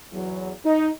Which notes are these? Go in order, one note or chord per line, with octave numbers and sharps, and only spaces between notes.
E2 F#3
D#4